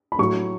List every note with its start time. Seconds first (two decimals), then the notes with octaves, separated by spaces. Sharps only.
0.12 B5
0.19 A2 F#3 A3 C#6